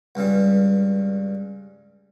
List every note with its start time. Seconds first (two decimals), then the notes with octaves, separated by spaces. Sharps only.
0.15 C#2 G2 C#3 G3